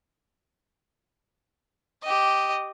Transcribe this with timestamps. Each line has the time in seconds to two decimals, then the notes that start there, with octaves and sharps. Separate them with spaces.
2.03 G4 D#5